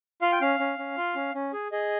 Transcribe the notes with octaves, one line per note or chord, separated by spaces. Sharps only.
F4 F5
G5
C#4 F5
C#4
C#4
F4
C#4
C#4
G#4
G#4 D#5